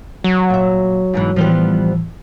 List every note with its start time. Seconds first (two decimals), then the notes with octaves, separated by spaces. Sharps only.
0.24 F#3
0.50 A#2 E5
1.14 G#2 B2 E3
1.36 A2 E3 F3 G3 B3